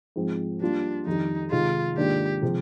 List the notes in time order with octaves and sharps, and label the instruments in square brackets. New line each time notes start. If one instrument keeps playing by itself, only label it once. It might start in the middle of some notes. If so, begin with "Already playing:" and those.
[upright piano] G#2 F3 C4
[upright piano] G3 A#3 F4 [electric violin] D4
[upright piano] F2 D#3 G3 [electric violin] D#4
[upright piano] C3 D#3 G#3 D#4 [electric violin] F4
[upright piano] G#2 D#3 A#3 D4 F4 [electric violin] G4
[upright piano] C3 F3 G#3